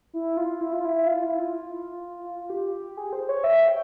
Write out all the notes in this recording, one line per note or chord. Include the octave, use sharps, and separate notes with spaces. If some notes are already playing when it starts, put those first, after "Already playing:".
E4
F4
E4
F4
E4
E4
F4
E4
F4
G4
G#4
C5
C#5
E5
G5